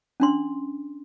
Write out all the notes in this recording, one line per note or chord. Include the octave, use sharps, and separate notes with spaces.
C#4 D4 C6